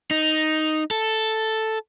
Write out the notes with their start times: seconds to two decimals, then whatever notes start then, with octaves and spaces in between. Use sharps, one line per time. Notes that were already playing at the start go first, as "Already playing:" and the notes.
0.11 D#4
0.91 A4